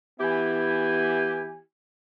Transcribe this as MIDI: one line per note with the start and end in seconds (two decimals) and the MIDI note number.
0.20 1.59 52
0.20 1.59 59
0.20 1.59 64
0.20 1.59 67
0.20 1.59 80